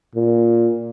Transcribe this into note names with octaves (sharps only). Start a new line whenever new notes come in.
A#2